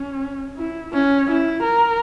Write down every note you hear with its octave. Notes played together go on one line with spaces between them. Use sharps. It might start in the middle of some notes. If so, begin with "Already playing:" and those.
Already playing: C#4
E4
C#4
E4
A#4